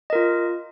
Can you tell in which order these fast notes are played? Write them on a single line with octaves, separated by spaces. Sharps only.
D#5 A#4 F4